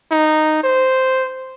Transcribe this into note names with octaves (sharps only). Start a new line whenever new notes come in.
D#4
C5